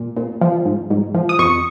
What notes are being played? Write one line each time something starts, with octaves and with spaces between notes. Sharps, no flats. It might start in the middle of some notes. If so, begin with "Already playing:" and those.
Already playing: A#2
A#2
F3
G#2
G#2
F3
D#6
F2 C#6